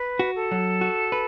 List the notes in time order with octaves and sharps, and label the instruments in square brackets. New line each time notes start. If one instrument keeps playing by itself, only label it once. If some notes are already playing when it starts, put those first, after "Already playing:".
Already playing: [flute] B4
[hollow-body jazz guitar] F#4
[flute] A4
[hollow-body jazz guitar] F#3
F#4
B4